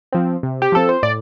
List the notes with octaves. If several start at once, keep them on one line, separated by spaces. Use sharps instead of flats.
F3 C4
C3
G4
F3 C4 A4
C5
A2 D5